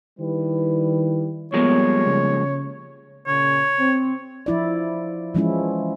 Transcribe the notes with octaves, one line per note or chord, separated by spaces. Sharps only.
D#3 G3 E4 B4
F3 G3 G#3 A#3 B3 C#5
C#3
A#2 C#3 C#5
C4
F3 E4 D5
E3 F3 G#3 C#4 E4